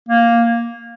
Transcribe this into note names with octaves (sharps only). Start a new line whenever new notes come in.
A#3